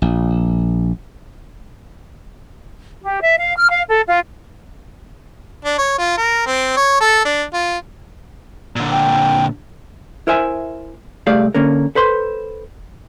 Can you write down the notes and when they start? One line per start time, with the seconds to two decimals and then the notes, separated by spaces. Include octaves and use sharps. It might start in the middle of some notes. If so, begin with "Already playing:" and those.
0.02 A#1
3.03 G4
3.21 E5
3.38 F5
3.57 F6
3.69 F5
3.89 A4
4.07 F4
5.65 D4
5.78 C#5
5.98 F4
6.17 A#4
6.47 C4
6.77 C#5
7.00 A4
7.25 D4
7.53 F4
8.76 A#2 D3
8.91 G5
10.27 E4 A#4 C5 E5 G#5
11.27 C2 A3 G4 G#4 D5 F5
11.55 D3 A#3 C#4 A#4
11.95 A4 B4 C5 C6